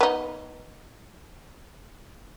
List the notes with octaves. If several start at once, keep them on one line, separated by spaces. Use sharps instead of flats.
B3 D#4